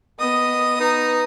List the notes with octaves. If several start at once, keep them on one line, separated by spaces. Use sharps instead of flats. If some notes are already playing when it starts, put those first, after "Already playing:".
B3 D#5 D#6
D#4 B4 A#5